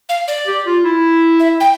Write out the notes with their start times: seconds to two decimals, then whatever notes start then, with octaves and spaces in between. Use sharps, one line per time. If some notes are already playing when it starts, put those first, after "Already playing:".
0.09 F5
0.28 D5
0.47 G4
0.66 F4
0.84 E4
1.40 E5
1.60 G5